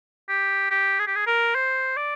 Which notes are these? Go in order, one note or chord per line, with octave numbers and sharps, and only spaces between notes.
G4
G4
G#4
G4
G#4
A#4
C5
D5